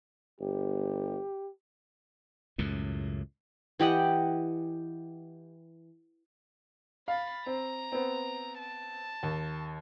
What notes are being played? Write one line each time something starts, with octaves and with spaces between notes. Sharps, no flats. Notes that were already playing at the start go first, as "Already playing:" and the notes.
G1 G4
C#2 F#2 A2
E3 G4 D#5 F#5
F5 B5 A6
C4 A#5
B3 C4
A5
D#2